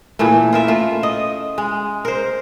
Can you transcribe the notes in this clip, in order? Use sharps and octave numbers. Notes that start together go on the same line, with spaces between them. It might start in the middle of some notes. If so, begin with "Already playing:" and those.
A#2 C#3 E3 A3
F4 A#4 E5
A3 F4
D#5
G#3
A#4 C5